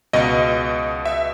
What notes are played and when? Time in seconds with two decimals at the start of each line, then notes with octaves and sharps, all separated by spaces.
0.13 C#2 B2 D#5
1.06 E5